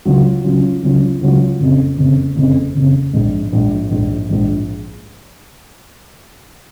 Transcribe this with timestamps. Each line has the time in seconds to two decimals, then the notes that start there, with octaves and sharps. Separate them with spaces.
0.05 C#2 C#3 F#3 C#4 F4
0.44 C#2 C#3 F#3 C#4 F4
0.83 C#2 C#3 F#3 C#4 F4
1.21 C#2 C#3 F#3 C#4 F4
1.60 F#1 F2 C#3
1.98 F#1 F2 C#3
2.36 F#1 F2 C#3
2.75 F#1 F2 C#3
3.13 A#1 G#2 F3 G#3
3.52 A#1 G#2 F3 G#3
3.90 A#1 G#2 F3 G#3
4.29 A#1 G#2 F3 G#3